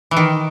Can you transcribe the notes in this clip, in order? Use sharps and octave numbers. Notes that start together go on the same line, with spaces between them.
E3
D#3